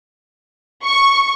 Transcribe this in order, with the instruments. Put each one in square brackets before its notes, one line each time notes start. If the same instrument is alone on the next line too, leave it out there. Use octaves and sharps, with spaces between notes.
[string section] C#6